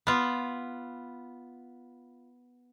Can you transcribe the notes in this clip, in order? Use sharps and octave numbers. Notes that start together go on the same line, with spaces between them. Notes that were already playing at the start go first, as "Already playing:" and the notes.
B3 F4